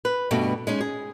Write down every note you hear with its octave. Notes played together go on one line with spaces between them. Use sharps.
B4
G2 B2 A3 B3
G#3 C#4 D#4
G#4